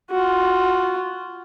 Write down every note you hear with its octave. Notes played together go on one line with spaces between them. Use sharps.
F4 F#4